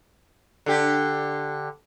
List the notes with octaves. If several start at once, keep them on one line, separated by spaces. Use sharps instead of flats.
D3 G4